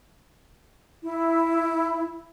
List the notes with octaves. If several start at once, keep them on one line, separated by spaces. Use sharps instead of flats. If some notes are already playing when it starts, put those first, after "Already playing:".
E4